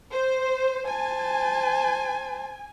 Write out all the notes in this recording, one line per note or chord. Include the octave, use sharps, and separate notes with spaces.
C5
C5 G#5 A5